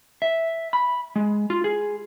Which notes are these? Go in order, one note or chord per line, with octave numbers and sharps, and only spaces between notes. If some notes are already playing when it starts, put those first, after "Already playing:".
E5
B5
G#3
F4
G#4